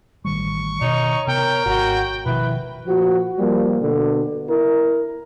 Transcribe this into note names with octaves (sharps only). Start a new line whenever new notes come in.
A1 D#3 G3 C#6
B2 D#3 D#4 C#5
C3 B3 A#4 G5
G#1 F#4
B2 D#3 F3 E4 B4
A#2 F3 F#4
F3 G3 A#3
B2 D3
E4 A#4